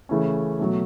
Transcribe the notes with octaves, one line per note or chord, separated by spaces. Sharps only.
C#3 E3 A3 C#4
B2 F#3 A3